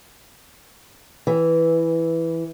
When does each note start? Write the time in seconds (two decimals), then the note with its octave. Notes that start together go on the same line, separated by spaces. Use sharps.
1.27 E3